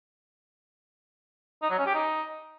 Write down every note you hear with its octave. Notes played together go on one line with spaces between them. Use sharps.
D#4
F#3
C#4
G4
D#4